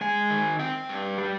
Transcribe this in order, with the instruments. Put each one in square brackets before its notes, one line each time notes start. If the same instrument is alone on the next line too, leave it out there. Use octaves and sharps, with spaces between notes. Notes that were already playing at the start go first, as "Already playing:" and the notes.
[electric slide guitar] G#3 G#5
D#3
C4 G5
G2
G3